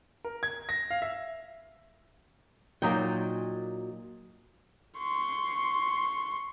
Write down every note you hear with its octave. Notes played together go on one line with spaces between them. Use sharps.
A#4
G#6
A#6
F5
E5
A#2 F#3 A#3 D#4 G5
C6 C#6